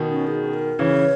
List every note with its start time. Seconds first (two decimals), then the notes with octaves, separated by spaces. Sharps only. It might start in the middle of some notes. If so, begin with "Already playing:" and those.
Already playing: B2 D#3
0.10 C#4
0.27 G#4
0.53 A#4
0.79 C#3 E3 C#5